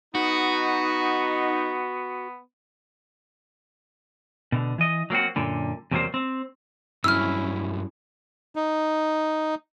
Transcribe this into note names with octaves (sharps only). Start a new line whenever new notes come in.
B3 D#4 F#4
B2 D3
E3 D#5
F#3 A#3 C4 F#4
F#2 A#2 D3
E2 C3 F#3 G3 A#3 C5
C4
G2 F#3 C4 C#4 E4 E6 F6
D#4